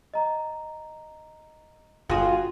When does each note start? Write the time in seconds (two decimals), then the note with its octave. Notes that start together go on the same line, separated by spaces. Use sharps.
0.14 D#5 A#5
2.10 G1 F4 F#4 G#4